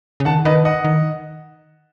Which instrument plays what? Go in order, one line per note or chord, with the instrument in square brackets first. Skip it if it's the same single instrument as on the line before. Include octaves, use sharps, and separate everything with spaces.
[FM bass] C#3
[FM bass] D#3 [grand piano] F#5 A5
[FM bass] D#3 [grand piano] B4 D#5
[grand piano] D#5 F#5
[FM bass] D#3